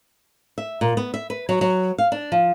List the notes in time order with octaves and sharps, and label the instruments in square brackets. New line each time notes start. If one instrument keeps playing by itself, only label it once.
[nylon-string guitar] E5
A#2
B3
E5
B4
F#3
F#3
F5
D4
F3